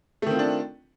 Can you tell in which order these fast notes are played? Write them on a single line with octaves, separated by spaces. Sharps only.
A3 D#3 C4 F4 D4